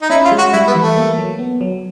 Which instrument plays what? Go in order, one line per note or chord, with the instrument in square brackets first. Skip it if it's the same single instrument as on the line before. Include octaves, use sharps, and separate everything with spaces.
[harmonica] D#4
[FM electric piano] C#4 [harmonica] E4
[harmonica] F4
[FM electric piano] G#3
[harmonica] F#4
[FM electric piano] G3 [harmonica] E4
[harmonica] B3
[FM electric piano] E3
[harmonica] A3
[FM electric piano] A#3
F#3
B3
F#3